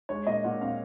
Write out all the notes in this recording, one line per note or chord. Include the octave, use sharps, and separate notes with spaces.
G#3 C#5
A#2 D#5
A#2 F#5
C4 F5